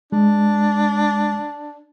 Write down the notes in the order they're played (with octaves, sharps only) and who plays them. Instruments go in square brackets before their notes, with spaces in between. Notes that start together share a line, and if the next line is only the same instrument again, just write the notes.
[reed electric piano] G#3 [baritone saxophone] D4